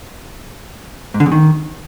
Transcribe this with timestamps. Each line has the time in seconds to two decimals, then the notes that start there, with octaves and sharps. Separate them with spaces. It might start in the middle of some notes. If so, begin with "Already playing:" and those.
1.14 G#2
1.20 D3
1.26 E2
1.32 D#3